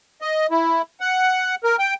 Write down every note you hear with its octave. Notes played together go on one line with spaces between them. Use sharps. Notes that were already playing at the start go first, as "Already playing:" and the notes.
D#5
E4
F#5
A#4
G5